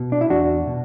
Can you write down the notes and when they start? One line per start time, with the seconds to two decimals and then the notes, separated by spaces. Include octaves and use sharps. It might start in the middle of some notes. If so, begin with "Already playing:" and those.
Already playing: B2
0.12 D4
0.21 E4
0.29 E2 D4 F#4
0.67 B2